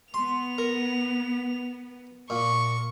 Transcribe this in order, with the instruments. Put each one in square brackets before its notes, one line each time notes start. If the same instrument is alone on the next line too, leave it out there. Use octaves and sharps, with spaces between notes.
[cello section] B3 [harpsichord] C6 [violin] F7
[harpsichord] A#4
[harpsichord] A#2 [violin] C#6